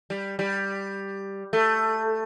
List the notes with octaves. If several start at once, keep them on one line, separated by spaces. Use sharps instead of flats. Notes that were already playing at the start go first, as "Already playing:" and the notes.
G3
G3
A3